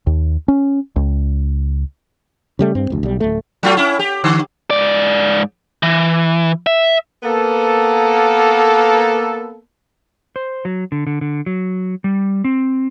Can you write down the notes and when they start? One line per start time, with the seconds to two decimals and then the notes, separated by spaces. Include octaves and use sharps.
0.07 D#2
0.48 C#4
0.96 C#2
2.59 C#3 G3 A3
2.75 G2 C4
2.90 F1 D2
3.03 B1 G3
3.20 D1 A3
3.63 F#3 A3 F4
3.77 C#4 E4
3.99 G4
4.24 D3
4.70 G#2 D5
5.83 E3
6.66 E5
7.23 A#3 B3 A4
10.36 C5
10.65 F#3
10.92 D3
11.07 D3
11.21 D3
11.46 F#3
12.04 G3
12.44 C4